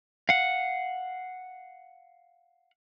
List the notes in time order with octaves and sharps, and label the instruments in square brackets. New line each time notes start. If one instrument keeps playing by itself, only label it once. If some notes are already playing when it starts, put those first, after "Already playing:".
[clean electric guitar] F5 F#5